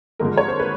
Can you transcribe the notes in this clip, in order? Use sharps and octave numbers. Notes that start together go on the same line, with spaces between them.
G#1 G2 D3 F3 G#3 A#4
C#5
C5
B4